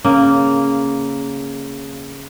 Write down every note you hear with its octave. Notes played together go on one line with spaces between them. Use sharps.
C#3 A#3